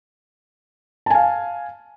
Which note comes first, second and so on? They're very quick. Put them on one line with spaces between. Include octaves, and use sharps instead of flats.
A5 G#5 F5